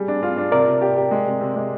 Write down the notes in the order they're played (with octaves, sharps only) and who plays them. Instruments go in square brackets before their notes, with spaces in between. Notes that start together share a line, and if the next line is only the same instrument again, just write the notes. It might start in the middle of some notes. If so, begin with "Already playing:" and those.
Already playing: [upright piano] G3 [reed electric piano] G#4
[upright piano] D4
F4
D4
[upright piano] C3 [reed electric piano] A#4 D5
[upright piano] C3
G4
G4
G#3
C3
C3
G#3